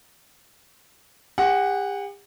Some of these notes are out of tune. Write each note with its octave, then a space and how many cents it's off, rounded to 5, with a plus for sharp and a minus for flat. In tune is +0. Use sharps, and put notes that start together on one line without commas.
G4 +45 F#5 +0